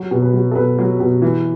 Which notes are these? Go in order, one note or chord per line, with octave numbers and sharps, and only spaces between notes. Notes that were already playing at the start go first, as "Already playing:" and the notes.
Already playing: F#3
B2
B4
F#3
A4
B2 B4
F#3
B2
E3